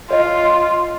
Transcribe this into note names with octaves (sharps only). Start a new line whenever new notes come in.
F4 C#5 D#5